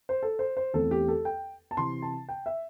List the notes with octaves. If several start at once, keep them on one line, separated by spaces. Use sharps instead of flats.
C5
A4
C5
C5
E2 E3 A3 C4 A4
G4
A4
G5
A5
C3 E3 C4 C6
A5
G5
E5